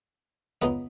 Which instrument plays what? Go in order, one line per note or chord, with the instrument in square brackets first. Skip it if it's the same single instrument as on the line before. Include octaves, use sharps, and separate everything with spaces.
[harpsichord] C#2 C#3 G#3 B3 D#4 B4